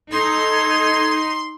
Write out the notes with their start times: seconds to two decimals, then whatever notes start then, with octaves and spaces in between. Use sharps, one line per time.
0.11 D#4 A4 C6 G#6